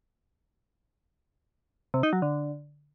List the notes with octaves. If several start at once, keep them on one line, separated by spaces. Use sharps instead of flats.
C3
D#4
F#3
D3